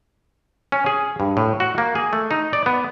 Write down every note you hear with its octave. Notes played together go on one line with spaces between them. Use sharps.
C#4
G#4
G2
A2
F#4
A#3
G#4
A3
D#4
D5
B3